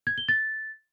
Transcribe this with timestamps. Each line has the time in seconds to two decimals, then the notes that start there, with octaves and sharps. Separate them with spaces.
0.07 G#6
0.18 G7
0.29 A6